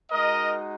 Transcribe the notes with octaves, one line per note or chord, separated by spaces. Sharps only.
G#3 D#4 F#4 A#4 D#5